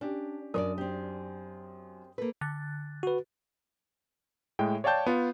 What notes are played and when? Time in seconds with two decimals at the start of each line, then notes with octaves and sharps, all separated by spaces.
0.01 C#4 D4 G4
0.54 F#2 D4 A#4 C#5 D5 D#6
0.78 C4 G4
2.18 A#3 A4 B4
2.41 D3 F#6 A6
3.03 F#4 B4
4.59 A2 G#3 G5
4.84 C#5 D5 F5 G5 A5 G6
5.06 B3 F4